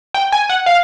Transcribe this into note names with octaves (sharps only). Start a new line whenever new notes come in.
G5
G#5
F#5
F5